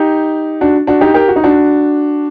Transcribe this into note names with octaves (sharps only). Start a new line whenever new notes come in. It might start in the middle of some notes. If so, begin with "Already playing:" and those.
Already playing: D#4 G4
D4 F#4
D4 F#4
D#4 G4
G4 A#4
F#4
D#4
D4 F#4